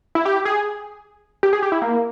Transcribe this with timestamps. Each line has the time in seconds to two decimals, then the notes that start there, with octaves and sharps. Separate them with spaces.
0.15 E4
0.25 G4
0.45 G#4
1.43 G4
1.53 G#4
1.62 G4
1.72 E4
1.82 A#3